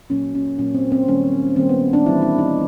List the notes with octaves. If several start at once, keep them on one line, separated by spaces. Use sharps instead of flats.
A#2 F#3 A#3 C#4
C#4
A#2 F#3 A#3 C#4
C4
C4
D#3 G3 A#3 C#4
D#3 G3 A#3 C4
B3
D4
E3 G3 B3 E4
E4
D#4